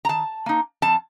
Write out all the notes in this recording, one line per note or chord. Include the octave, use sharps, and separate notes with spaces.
A#5
D#3 A5
A#3 D#4
F2 A5